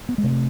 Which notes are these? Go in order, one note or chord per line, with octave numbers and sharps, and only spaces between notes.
B3
G#3
C3 A3